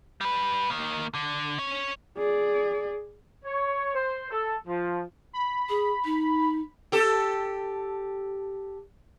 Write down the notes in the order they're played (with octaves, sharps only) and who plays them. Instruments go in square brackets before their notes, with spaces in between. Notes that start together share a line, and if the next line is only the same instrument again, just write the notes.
[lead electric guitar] G3 B4
D#3 A#3
D3
C#4 C#5
[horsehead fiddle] G#4 D5
[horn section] C#5
C5
A4
F3
[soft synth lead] B5
[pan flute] G#4
D#4
[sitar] G4 A4